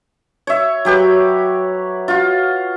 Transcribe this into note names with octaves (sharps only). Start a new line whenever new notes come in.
C#5 E5
F#3 G4 B4
F4 F#4